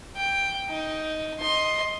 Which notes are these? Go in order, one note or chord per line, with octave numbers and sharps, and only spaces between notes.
G5
D#4
D#5 C6